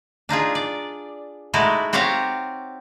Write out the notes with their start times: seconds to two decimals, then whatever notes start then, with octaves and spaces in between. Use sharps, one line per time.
0.29 D4 D#4 F4 G#4
0.55 D5
1.54 G#3 A3 D#4 E4 F#4
1.93 C4 F#4 G4 C#5 F5 A#5